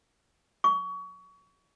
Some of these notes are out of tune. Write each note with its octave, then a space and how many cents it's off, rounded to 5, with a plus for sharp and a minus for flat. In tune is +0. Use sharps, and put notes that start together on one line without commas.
C#6 +30